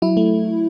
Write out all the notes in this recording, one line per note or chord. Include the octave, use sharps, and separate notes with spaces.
F#3 E4
A3